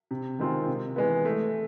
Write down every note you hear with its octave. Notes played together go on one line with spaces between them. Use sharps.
C3
D#3 G#3 C4 F4
C3
E3 G#3 B3
A3